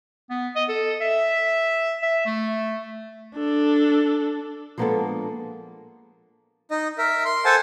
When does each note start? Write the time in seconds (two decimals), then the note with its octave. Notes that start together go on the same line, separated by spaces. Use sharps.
0.30 B3
0.56 D#5
0.69 A4
1.01 E5
2.02 E5
2.26 A3
3.35 D4 A4
4.78 F3 G#3 A#3 B3 D4 A4
6.71 D#4 D#5
6.98 A#4 E5
7.25 C6
7.45 A4 C5 F#5 G#5 A5